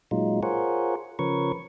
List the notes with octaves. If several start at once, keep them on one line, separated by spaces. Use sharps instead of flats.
A#2 F#3 G#3 D#4 F4
F4 G#4 A#4 C5 C#5 F#5
C#3 F3 A#4 B4 C#5 C#6